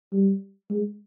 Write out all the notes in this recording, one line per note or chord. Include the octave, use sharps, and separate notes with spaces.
G3
G#3